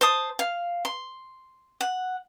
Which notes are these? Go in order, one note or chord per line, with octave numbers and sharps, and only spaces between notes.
C5 A5 D#6
F5
C6
F#5